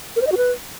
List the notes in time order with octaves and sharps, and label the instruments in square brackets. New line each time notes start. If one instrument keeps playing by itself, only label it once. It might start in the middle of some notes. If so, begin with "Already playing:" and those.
[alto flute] A#4
C5
D#5
F#4
B4